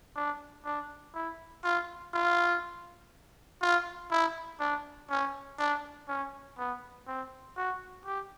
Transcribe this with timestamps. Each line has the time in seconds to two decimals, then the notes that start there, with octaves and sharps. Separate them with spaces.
0.16 D4
0.65 D4
1.15 E4
1.64 F4
2.14 F4
3.62 F4
4.11 E4
4.60 D4
5.10 C#4
5.59 D4
6.09 C#4
6.58 B3
7.07 C4
7.57 F#4
8.06 G4